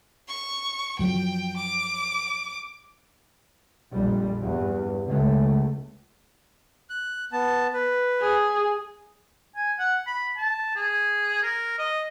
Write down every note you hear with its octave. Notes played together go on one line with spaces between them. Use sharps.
C#6
F#2 F3 F#3 G5
D6
A#1 F2 G3
E2 G2
C#2 A3
F#6
B3 A5
B4
G#4
G#5
F#5
B5
A5
G#4
A#4
D#5